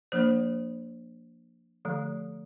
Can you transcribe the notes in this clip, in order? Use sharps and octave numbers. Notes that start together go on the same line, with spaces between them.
F3 A#3 D4 C5
D3 F3 A3